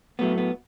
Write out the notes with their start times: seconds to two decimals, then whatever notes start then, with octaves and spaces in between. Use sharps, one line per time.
0.19 A2 F#3 A3 B3
0.38 B3